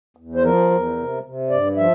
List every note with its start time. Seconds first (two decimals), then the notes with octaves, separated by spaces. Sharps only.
0.17 E2
0.35 C5
0.43 F3 A#4
0.71 E2
0.97 C3
1.24 C3
1.50 G2 D5
1.77 F3 E5